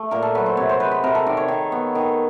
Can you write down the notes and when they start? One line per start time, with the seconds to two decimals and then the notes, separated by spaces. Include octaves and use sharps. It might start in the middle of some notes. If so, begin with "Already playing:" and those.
Already playing: A3
0.11 A#2 A#4
0.22 A4
0.35 F#3 B4
0.46 C5
0.57 C3 C#5
0.69 C5
0.80 G#3 B4
0.91 B4
1.04 C3 A#4
1.15 A4
1.26 D#3 D5
1.37 C#5
1.48 D#3
1.72 B3
1.95 D#3